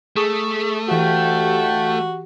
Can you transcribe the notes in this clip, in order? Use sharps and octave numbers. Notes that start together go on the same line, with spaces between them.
A3 G#4 C#6 D#6
D2 E3 F#4 G4 F5 G5